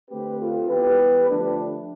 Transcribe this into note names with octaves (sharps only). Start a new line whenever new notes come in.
D3 A3 C4 G4 B4
F4 A4
E3 B3 G4 B4
D3 F3 A3 D4